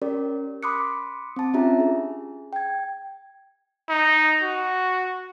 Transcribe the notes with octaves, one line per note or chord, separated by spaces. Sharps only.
C#4 G4 A#4 D5
B5 C6 D6 D#6 F#6 C#7
C4 A5
C#4 D4 F4 G4 E5 A#5
G#4
G5 G#6
D#4
F#4